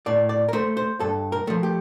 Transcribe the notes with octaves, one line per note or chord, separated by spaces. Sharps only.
A2 D5
D5
A#4
A3 C5
C5
G2 A4
A#4
F3 A3
G4